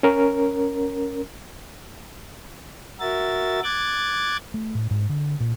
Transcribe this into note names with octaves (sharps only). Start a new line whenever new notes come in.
C#4 A#4
F#4 A#4 E5 A6
D6 F#6 G#6 A6
A3
A2
G#2
D3
A#2